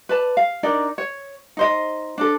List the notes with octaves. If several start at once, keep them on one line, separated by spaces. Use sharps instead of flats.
B4 D5 A5
F5
D4 D#4 A#4 D5
C#5
D#4 C5 D#5
D4 A4